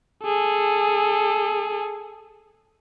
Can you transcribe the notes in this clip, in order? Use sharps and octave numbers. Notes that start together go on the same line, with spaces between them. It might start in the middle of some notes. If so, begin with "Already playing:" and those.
G#4 A4